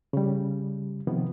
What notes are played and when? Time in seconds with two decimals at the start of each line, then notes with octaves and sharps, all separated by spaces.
0.13 C#3 G3
1.07 C3 D#3 F3 B3